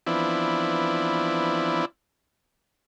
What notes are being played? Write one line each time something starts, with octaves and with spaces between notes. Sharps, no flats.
E3 F3 B3 C4 D4 E4